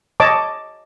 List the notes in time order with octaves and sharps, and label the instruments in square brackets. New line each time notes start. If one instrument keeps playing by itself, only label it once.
[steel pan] C#5 D#5 A5 D6